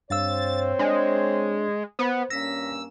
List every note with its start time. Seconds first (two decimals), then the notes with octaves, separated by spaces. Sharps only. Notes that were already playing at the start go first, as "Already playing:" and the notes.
0.10 G2 C4 C5 C#5 F5 E6 A6
0.79 G#3 D4 D5
1.99 B3 C5
2.30 G2 A#3 C#4 E6 A#6 B6